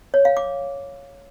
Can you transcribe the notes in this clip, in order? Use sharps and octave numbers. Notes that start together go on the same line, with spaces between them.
C#5
F5
D6